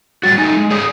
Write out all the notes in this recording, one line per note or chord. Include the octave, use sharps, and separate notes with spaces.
A2 G3 F#4 A6
A3 D#4 G#5
G#3
G#4 C#5 D5 D#6